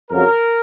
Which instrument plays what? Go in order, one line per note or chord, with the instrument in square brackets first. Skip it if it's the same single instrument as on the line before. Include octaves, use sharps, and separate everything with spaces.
[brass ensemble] F2 C#3 F#3 A#4